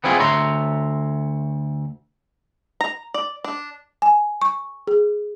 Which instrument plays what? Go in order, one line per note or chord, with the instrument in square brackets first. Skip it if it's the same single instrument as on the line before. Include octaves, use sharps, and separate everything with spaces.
[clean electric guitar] B3 C4 E4 F4 G#4
D2 C#5 E5 A#5 C6
[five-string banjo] A#5
D5
D4
[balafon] G#5
C#6
G#4